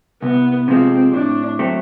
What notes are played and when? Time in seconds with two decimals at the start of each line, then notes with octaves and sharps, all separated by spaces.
0.22 C2 B3
0.68 C3 F3 G#3 C4
1.13 A2 D4
1.59 F#3 A3 C4